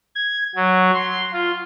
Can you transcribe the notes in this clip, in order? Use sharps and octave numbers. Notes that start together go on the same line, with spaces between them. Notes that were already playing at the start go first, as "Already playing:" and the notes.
G#6
F#3
C6
F4